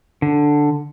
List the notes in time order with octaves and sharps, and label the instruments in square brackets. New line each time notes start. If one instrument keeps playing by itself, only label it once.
[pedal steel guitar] D3